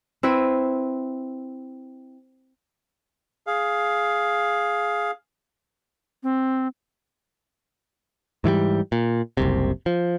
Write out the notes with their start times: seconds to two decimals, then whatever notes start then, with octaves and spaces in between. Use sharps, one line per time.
0.23 C4 E4 B4
3.47 G#4 F5
6.23 C4
8.44 G#2 E3 F#3 G3
8.92 A#2
9.37 F#1 C2 C3
9.86 F3